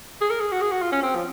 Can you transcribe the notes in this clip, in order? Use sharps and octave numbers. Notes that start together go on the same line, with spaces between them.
G#4
A#4
G#4
F#4
G#4
F#4
F4
C#4
C4
F3